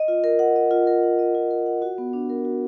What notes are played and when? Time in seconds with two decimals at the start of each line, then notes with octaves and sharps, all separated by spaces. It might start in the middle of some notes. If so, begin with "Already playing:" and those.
Already playing: D#5
0.08 F4
0.24 A#4
0.39 F#5
0.56 D#5
0.71 F4
0.87 A#4
1.03 F#5
1.19 D#5
1.35 F4
1.51 A#4
1.66 F#5
1.82 F#4
1.98 B3
2.13 D4
2.29 A#4
2.45 F#4